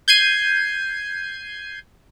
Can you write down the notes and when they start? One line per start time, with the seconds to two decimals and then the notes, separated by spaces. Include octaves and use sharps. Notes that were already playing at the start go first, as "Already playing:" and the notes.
0.08 G6 G#6 C7 D#7